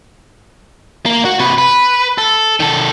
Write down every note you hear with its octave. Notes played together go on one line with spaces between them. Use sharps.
A#3
F#4
C3 B4
B4
A4
D#3 A4